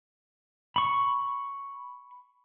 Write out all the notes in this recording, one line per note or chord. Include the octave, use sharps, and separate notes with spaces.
B5 C#6